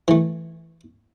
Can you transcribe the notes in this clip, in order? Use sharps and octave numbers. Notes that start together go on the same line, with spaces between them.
E3 A3